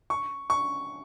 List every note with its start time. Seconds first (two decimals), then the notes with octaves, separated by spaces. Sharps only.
0.10 C#6
0.50 C#6